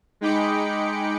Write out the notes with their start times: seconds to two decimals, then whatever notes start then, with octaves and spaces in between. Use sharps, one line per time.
0.21 G#3 D#4 G5 B5 D6 C#7